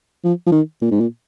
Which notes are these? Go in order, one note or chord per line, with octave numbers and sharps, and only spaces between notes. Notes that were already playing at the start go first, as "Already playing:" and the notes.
F3
F3
D#3
A#2
G#2
A#2